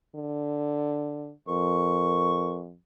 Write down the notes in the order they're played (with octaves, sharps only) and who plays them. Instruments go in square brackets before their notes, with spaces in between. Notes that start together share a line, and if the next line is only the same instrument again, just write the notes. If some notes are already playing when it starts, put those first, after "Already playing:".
[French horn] D3
[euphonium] F2 [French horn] A#4 [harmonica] C#6